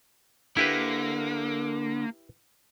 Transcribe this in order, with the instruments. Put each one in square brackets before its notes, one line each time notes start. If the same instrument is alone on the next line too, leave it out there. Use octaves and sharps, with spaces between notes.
[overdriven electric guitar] D3 [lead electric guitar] A#3 [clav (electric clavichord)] E4 G4 B4